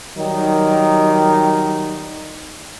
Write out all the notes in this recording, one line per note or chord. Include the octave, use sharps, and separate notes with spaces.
D#3 F#3 G3 D#4